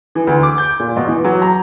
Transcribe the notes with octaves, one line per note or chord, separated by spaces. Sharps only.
E3
D2
D6
G6
A#2
B2
E3
F#3
A#5